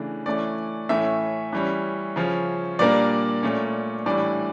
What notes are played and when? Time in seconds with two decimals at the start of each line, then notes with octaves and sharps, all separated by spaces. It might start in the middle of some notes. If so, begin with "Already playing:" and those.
Already playing: C#3 E3 A3 D4
0.26 E3 A3 C#4 D5
0.89 A2 E3 A3 C#4 E5
1.53 E3 G3 C#4
2.16 C#3 F3 C#4
2.79 A#2 G3 A#3 D4 D5
3.43 A#2 A3 C#4
4.06 A2 E3 G3 D4 D5